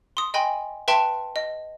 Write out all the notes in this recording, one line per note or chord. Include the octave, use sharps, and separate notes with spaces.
C6 D#6
D#5 G5 G#5 B5 C6
B4 E5 G5 A5 C6
D#5